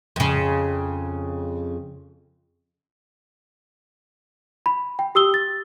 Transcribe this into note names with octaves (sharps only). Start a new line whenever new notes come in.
F2 C#3
B5
G5
G4 D#6 E6 G7
A6